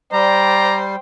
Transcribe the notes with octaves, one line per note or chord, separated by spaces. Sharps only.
G3 C5 D5 G5 A#5